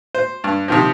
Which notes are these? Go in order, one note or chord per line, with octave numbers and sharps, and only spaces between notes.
C5
G2
C3 D#3 F3